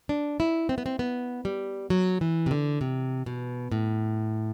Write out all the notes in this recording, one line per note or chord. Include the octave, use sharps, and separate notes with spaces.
D4
E4
C4
B3
C4
B3
G3
F#3
E3
C3
D3
C3
B2
A2